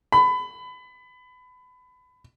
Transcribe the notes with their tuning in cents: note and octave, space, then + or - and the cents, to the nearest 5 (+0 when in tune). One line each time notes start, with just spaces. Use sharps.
B5 +25